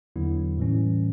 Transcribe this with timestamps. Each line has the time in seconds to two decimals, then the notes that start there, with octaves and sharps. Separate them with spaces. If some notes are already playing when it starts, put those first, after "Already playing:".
0.16 E2 D3 F#3 B3 E4
0.57 A2 E3 G3 C#4